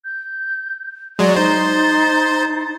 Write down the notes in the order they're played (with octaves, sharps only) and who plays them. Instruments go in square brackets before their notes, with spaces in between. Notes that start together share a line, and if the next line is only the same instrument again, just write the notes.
[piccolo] G6
[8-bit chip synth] F#3 G#3 [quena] D5
[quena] D#4 [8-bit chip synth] C5 [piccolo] A6